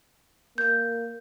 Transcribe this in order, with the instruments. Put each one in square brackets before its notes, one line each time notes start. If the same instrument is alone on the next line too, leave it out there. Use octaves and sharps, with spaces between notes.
[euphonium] A#3 [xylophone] G6